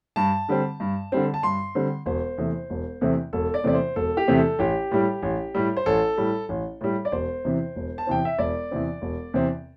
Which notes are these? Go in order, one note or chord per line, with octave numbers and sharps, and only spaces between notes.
G2 A5
D3 G3 C4
G2
D3 G3 C4
A5
G2 C6
D3 G3 C4
E1 C5
E2 C3 A3 C4
E1
E2 C3 A3 C4
E1 A4
D5
E2 C3 A3 C4 D5
C5
E1 A4
G4
E2 C3 A3 C4
A4
A1 G4
A2 G3
A1
A2 G3
C5
A1 A4
A2 G3
A1
A2 G3
D5
E1 C5
E2 C3 E3 C4
E1
A5
E2 C3 E3 C4 G5
E5
E1 D5
E2 C3 E3 C4
E1
E2 C3 E3 C4